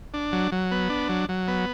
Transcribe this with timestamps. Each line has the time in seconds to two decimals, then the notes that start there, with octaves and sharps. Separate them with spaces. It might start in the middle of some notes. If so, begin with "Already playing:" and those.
0.14 D4
0.33 F#3
0.52 F#3
0.71 B3
0.90 D4
1.09 F#3
1.29 F#3
1.48 B3